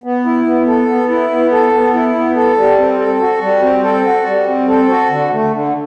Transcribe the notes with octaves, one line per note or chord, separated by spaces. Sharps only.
B3
E4
B3
A4
B3
E4
B3
A4
B3
E4
B3
A4
G3
C4
A4
F#4
G3
C4
A4
F#4
G3
C4
A4
F#4
D3
A3
D3